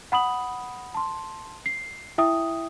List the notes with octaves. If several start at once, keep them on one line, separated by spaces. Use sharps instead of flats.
F#5 B5 D#6 F#7
A5 C6
C7
E4 E5 G5 D#6